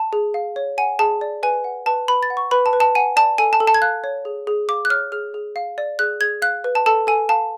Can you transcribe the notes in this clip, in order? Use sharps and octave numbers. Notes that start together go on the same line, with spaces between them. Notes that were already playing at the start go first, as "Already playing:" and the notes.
Already playing: A5
G#4
F5
C#5
F#5 G#5
G#4 A5
D5
B4 G#5
F#5
B4 A5
B4 B5
A6
F#5
C#6
B4 B5
A5
B4
A5
F#5 G#5
D5 A5
A4 G#5
A5
A4
A5
G#6
F5 F#6
C#5
G#4
G#4
F5 D6
F#6
C#5 F6
G#4 F6
G#4
F5
D5
G#4 F#6
G#4 G#6
F5 F#6
B4
A5
A4 A5
A4 G#5
F5 A5